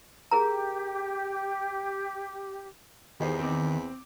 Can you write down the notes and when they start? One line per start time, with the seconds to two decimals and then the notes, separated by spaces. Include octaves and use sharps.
0.31 G4 G#4 A#4 A#5
3.20 E2 D#3 G4 G#4 C5
3.39 C4 D6